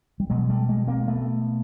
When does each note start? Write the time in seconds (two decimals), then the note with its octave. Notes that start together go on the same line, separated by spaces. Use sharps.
0.20 G3
0.30 B2 F#3 G#3
0.49 G3 A3
0.69 G#3 A#3
0.87 A#3 C4
1.07 A3 B3